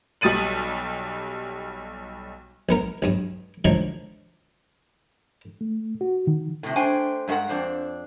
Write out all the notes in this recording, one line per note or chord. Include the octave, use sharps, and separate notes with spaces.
B1 G3 D#6 A6 D#7 F#7
A#1 B3 A#4
B1 G2 D#6
D3 D#3 F3 F#3 A3 A#3
A3
F#4
D#3
A2 C3
A3 D4 C5 G5 G#5
G2 G#3 F#4 A#4 F#5
F2 D4 C5